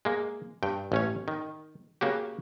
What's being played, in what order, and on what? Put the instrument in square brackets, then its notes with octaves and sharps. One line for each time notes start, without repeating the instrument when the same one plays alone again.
[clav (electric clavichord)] G#3 A#3
G2 G5
A1 C#4 C#5
D#3
C#3 A#3 F#4 G4